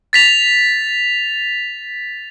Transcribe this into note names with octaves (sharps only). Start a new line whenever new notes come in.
A6 B6 F7